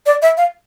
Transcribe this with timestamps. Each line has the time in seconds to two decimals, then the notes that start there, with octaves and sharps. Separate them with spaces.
0.06 D5
0.22 E5
0.37 F5